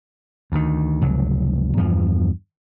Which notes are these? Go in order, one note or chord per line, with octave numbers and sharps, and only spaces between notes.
D2 D#3
F1 C#2 F#3
E2 G2 F3